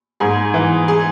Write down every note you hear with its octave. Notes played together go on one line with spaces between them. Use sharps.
G#2 G#4
E3
G#4